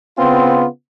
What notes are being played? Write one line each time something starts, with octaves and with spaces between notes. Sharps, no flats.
C#3 B3 C4 F4